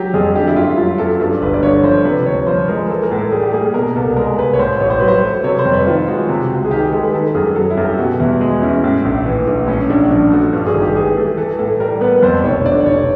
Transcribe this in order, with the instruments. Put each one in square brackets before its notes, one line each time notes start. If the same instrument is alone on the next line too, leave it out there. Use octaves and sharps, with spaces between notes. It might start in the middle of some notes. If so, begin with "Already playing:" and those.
Already playing: [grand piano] F#3 [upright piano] G4
[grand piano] F2 [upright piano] G#4
[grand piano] D3 [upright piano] G4
[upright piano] E4
[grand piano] F#2 [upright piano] F4
[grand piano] F#3 [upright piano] F4
[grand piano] F#2 [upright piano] A4
[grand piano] G2
[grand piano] G1 [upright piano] B4
[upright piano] D5
[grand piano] D3 [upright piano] C#5
[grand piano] F3 [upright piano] C5
[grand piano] C3 [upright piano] B4
[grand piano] D2 [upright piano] C#5
[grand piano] F3 [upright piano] C5
[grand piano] G#3 [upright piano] A#4
[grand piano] E3 [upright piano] A4
[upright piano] A#4
[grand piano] A2
[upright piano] A4
[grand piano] G3 [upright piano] G#4
[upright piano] G4
[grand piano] A#3 [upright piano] G#4
[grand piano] B2 [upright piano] A#4
[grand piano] C2 [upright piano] A4
[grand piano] G#3 [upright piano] A#4
[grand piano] C2 [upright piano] B4
[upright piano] C#5
[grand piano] A2 [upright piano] C5
[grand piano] A1 [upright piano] C#5
[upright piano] C5
[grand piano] F#3 [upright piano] B4
[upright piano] C5
[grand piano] A3
[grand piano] C3 [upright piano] C#5
[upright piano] C5
[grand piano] F2
[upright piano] B4
[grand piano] D#3 [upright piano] F4
[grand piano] G#3 [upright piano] F#4
[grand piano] C3
C#2
[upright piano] G#4
[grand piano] D#3 [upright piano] G4
[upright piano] G#4
[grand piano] G#3 [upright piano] A4
[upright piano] B4
[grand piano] D#3 [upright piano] A4
[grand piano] F#2 [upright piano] G#4
[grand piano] F#3 [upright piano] A4
[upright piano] E4
[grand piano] F#2
[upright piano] G4
[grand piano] B2 [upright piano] F#4
[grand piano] E2 [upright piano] E4
[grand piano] G#3
[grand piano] C#4 [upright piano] E4
[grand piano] A2
A#1
E3
A#1
[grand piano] A2 [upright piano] C#4
[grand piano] A#1 [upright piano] D4
[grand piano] F3 [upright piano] D4
[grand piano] A3 [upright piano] F#4
[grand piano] G2
[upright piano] G#4
[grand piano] G#1
[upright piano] G4
[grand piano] E3 [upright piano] G#4
[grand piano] A3
[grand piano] E3 [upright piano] A4
[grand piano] A2 [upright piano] A4
[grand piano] G3 [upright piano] A#4
[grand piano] B3 [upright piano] B4
[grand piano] F2 [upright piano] C5
[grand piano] F1 [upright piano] C#5
[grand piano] D3 [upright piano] D5
[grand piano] F1 [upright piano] C#5